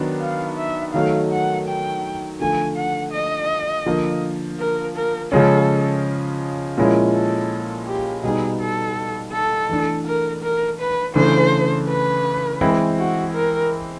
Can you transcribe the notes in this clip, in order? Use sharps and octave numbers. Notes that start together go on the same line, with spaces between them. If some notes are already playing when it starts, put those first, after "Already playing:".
Already playing: D#3 F#3 B3 D4
F5
E5
D#3 F#3 A3 F5
F#5
G5
D3 F3 A3 G#5
F#5
D#5
D3 F3 A#3
A#4
A#4
C#3 F3 G#3 C#4 A4
A#2 F3 G#3 C#4 E4
A4
G4
B2 G3 B3 D#4 G#4
A4
A4
E3 A3 D4
A#4
A#4
B4
C#3 E3 A3 D4 C5
B4
E3 G#3 C4 E4
F#4
A#4